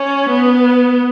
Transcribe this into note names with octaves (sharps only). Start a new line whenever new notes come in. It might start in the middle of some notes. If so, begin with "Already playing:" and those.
Already playing: C#4
B3